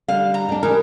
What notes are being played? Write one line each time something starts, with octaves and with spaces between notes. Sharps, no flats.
D3 G3 F5
A#5
G3 D4
E3 G4 G#4 A#4